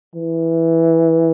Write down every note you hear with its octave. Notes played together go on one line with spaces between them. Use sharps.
E3